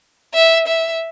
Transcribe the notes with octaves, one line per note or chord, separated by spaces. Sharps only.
E5
E5